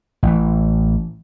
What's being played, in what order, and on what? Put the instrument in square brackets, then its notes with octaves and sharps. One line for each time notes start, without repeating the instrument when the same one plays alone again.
[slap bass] A1 E3